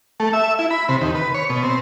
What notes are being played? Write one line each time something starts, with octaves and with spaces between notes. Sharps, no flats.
A3
E5
E4
B5
C3
D#2
B4
C#5
B2
C4